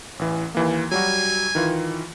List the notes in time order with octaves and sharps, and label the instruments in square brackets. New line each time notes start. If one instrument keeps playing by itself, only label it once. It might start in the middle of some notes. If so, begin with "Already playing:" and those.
[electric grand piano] A1 E3
D#2 E3 A#3
[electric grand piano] F#3 G3 F#4 [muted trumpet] G#5
[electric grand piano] D#3 E3 F4